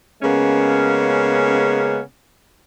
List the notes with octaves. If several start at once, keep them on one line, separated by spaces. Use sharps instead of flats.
C#3 G#3 A#3 B3 C#4